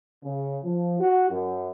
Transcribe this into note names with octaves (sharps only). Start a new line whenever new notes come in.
C#3
F3
F#4
F#2